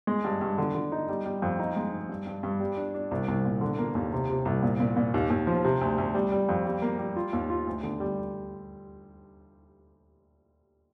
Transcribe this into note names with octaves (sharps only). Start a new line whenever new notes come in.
G#3
G2
G2
D3
D3
D#4
G3
G3
F2
D#4
G#3
G#2
G2
G2
G2
G3
D4
D4
C2
C2
A#2
D3
A#3
D#2
C3
C3
C2
A#2
A#2
A#2
D#2
D#2
F3
C3
D2
D2
G3
G3
F2
G3
A#3
G3
F4
D#2
F4
D2
D3
G3